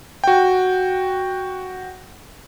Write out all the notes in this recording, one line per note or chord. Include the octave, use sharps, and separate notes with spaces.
F#4 G5